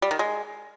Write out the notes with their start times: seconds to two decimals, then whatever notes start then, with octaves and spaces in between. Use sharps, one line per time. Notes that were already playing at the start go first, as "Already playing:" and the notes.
0.02 G3
0.11 D#3
0.19 G#3